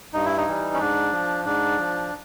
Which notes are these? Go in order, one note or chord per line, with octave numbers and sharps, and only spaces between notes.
G2 D#4
E4
D#4
E3 G3
C#4
G#2 D4
F3
G#2 D4
F3